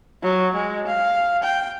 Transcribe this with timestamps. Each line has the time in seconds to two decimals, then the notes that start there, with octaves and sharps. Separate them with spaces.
0.23 F#3
0.54 G#3
0.87 F5
1.43 G5